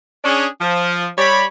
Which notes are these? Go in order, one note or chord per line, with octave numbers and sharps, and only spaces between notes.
C#4 D4 G#4
F3
G3 C#5 B5